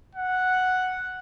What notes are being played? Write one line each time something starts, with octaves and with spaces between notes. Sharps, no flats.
F#5